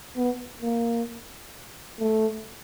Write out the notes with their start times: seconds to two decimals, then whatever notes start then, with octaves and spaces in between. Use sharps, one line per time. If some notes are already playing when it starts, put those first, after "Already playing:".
0.17 B3
0.62 A#3
1.99 A3